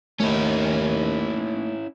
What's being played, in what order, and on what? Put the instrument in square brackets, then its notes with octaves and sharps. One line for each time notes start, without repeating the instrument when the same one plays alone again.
[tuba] D#2 [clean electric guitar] A3 A#3 D#4 [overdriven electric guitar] C#4 E4